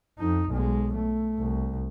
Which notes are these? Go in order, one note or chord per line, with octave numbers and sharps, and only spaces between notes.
F2 D#4
B1 G#3
A3
C2